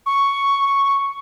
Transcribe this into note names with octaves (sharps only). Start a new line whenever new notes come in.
C#6